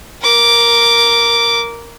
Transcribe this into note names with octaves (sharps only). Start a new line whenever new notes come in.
A#4 D6